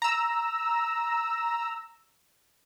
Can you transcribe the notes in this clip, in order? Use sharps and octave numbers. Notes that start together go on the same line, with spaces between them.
A#5 E6